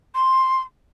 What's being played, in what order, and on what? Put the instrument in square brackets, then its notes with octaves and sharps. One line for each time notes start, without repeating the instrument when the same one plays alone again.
[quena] C6